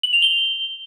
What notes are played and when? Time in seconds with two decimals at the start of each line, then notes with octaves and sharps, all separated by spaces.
0.03 F#7
0.13 F7
0.22 G7